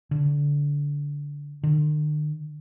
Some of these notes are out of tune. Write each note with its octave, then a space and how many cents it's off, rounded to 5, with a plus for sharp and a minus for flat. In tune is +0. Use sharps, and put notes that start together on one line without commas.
D3 -20
D3 +45